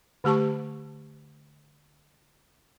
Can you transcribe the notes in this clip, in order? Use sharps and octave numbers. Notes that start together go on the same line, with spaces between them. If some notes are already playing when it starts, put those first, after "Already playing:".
D3 A3 G4 A5 C#6